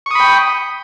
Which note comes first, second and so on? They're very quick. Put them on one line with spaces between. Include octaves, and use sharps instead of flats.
C#6 D#6 B5 G5